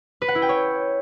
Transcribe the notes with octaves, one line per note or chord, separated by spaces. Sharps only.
B4
F#5
E4
G5
C#5